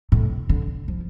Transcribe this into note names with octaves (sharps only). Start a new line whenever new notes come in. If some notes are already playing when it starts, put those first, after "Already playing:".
A2
D3
F3